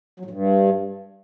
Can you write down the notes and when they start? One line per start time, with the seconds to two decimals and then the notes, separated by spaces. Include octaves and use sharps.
0.20 F#3
0.25 A2
0.31 G2